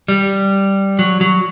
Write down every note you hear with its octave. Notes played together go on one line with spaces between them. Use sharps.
G3
F#3
F#3